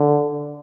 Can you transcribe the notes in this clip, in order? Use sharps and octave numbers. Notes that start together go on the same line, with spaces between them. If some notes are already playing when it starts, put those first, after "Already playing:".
Already playing: D3